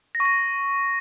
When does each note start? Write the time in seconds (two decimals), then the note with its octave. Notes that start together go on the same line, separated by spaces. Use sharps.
0.15 A#6
0.20 C#6
0.25 A#6